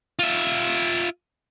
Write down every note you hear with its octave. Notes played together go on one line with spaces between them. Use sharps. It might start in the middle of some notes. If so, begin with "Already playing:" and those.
F4 E5